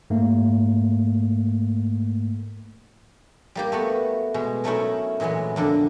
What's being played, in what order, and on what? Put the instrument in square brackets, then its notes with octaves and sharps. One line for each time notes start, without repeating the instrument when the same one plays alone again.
[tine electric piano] G#2 A3 A#3
[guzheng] G3 A#3 G4
A3 B3 F#4
B2 G#3
F#3 A3 C#4 D#4 E4 A#4
A#2 E3 F#3 G#3 B3
F2 D3 D4 A#4